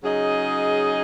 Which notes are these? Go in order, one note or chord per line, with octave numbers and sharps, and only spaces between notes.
C#3 F#3 D#4 G#4 D#5